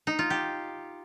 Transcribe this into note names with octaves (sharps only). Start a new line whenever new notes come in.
D#4
F4
G4